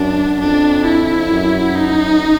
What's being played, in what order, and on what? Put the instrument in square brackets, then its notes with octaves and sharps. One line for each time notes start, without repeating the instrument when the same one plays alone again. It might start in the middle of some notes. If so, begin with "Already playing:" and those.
Already playing: [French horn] F#2 [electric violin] D4
[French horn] F2 [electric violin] D4
[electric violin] E4
[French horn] F#2
[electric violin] D#4